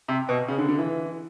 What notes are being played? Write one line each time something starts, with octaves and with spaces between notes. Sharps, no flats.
C3
B2
C#3
D3
D3
E3